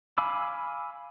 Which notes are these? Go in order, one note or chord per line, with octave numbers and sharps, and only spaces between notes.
F5 G#5 B5 D6 E6